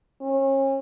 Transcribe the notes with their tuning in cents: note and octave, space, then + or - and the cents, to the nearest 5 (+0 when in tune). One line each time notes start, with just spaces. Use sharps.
C#4 -35